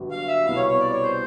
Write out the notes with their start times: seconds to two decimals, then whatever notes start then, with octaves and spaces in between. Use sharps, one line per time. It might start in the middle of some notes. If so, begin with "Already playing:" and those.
Already playing: G1 G2 D3 F#3
0.11 F5
0.28 E5
0.45 C2 B2 G3 B3 E4 F5
0.56 C#5
0.68 C#5
0.80 D5
0.92 C#5
1.03 C5